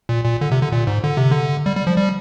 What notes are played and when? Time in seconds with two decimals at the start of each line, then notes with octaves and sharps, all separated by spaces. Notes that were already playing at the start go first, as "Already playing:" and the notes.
0.09 A#2
0.25 A#2
0.41 D3
0.52 C3
0.61 D3
0.72 A#2
0.87 G#2
1.04 D3
1.17 C3
1.31 D3
1.66 G3
1.76 G3
1.87 F3
1.98 G3